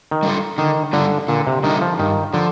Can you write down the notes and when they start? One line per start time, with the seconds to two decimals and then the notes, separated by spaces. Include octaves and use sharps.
0.11 D#3
0.23 G3 D4 F4 A4
0.58 D3 D#3
0.93 D3 G3 D4 F4 A4
1.28 A#2 D3
1.47 C3
1.63 D#3 G3 D4 F4 A4
1.81 F3
1.99 G2 D#3
2.33 D3 F3